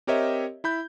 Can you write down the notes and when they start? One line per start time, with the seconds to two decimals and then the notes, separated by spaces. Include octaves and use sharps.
0.07 C4 G4 A#4 C#5 D#5 E5
0.64 E4 B5 G6